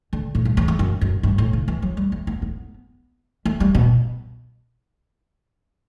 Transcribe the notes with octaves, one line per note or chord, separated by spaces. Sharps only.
D3
A2
G2
E2
E2
F#2
F#2
G2
A2
C#3
E3
F#3
G3
A3
B3
B3
A3
G3
B2